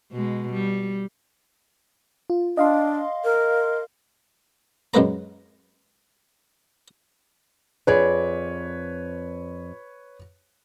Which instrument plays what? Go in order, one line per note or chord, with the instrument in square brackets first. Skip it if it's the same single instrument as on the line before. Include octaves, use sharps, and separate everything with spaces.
[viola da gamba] B2 G#3
G3
[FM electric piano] F4
[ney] D4 [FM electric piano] D#5 F5 C6
[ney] A#4
[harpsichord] F#2 G#3 A#3 B4 A#5
[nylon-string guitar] F2 G#4 D5 [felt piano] B4 C#5